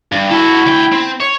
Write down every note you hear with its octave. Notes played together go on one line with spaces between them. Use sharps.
G2
E4 F#4 A4
D2 G5
C4
C#5